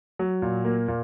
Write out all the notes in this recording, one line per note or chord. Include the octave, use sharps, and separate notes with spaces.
F#3
A#2
A#3
A#2